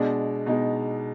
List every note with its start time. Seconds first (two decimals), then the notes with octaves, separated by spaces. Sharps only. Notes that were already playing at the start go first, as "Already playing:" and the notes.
Already playing: B2 G#3 D4
0.46 B2 G#3 D#4